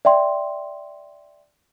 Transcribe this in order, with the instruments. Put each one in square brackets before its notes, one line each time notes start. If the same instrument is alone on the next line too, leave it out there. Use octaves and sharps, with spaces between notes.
[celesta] D5 E5 G5 C6